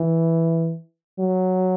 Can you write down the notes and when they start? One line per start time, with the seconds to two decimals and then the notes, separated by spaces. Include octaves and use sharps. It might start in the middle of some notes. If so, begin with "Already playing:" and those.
Already playing: E3
1.19 F#3